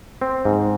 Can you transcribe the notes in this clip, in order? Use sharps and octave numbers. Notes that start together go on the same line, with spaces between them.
C4
G#2